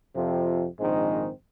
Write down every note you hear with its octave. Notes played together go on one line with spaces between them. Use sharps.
F2 C3 F3 C4 F4
A#1 G#2 D#3 G#3 C4